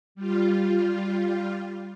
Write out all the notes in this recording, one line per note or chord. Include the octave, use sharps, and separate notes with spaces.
G3 F4